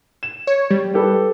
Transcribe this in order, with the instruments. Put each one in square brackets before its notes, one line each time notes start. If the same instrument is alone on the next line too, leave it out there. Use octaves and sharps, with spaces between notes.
[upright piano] E7
[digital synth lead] C#5
G3
[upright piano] G4 A4 B4